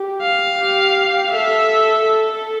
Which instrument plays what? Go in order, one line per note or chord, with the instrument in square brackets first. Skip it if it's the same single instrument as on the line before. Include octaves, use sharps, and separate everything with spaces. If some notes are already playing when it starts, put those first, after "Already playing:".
Already playing: [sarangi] G4
[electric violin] F5
[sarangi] G4
[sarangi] A4 [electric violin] E5
[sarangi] A4
A4